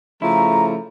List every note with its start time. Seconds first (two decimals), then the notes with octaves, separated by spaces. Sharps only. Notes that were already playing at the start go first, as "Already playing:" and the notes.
0.22 C#3 F3 A3 E4 A#5